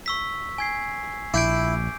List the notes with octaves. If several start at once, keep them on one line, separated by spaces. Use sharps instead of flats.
C#6 E6 B6
G#5 G#6 C7
A#1 E4 D6 G6 D7